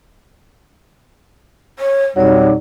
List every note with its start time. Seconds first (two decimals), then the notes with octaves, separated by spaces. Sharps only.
1.79 C#5
2.16 F2 B2 F#3 G3 D#4 G4 C#5 D5